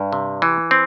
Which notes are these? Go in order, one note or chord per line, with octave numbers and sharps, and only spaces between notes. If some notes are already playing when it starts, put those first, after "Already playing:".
Already playing: G2
C3
E3
C4